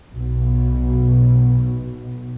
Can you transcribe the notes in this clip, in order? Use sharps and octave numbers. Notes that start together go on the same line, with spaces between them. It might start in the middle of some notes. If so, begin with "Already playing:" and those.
B1 B2